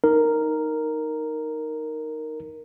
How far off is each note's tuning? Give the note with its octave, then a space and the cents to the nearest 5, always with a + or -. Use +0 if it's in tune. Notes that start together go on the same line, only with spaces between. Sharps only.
D#4 +0 A#4 -5